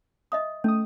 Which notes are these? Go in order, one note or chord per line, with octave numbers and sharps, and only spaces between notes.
D#5 E5 D#6
A3 C#4 D#6